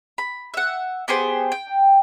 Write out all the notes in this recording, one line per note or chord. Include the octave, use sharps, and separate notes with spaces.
B5
E5 F#5
B3 G4 G#4 C5
G5